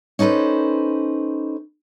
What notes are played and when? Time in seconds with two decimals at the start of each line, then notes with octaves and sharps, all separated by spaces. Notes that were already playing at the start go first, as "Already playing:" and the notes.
0.19 C#4 D#4 A4 B4 C5